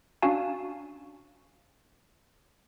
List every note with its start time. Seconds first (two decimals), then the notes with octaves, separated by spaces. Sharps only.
0.22 C#4 D4 F#4 F5 G#5 A5